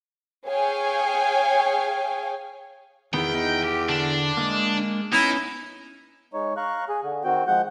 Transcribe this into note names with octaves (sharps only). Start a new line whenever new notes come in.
G#4 C#5 F5 G5 G#5
E2 D#3 B3 G5
D#4
G4
D3 D4
G#3 A#3
B3 C#4 D#4 E4
G#3 D#4 C#5
F5 A#5 C#6 F#6
G#4
D3
D#3 C4 F#4 G5
F3 G#3 F#5 G6